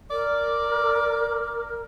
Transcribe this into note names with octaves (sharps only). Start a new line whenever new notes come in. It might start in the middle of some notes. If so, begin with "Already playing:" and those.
A#4 D5